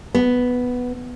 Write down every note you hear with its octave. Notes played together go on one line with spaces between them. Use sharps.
B3